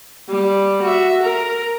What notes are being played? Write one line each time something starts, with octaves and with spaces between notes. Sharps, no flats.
G3
F#4 E5
A#4